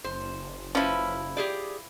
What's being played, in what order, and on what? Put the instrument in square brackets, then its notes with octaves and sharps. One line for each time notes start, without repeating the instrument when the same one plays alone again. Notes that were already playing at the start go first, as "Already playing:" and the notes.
[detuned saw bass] F#1 [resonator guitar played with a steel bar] C5
[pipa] F3 E4 [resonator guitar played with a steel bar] C#4 B4
[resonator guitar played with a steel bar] G4 G#4 D5